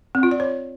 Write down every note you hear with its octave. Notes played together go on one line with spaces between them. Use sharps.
C4
F4
D5
C#5